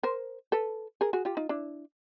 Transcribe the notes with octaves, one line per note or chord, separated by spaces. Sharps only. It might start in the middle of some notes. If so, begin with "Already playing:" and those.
A#4 C5
A4 B4
G#4 A#4
F#4 G#4
F4 G4
D#4 F4
D4 E4